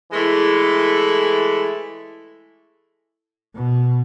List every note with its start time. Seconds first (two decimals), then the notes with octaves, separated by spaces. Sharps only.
0.12 E3 G#3 A3 E4 A4
3.55 B2